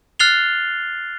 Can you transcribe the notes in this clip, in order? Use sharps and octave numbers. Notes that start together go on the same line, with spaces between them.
F6 F#6 A6 C7 F7 G7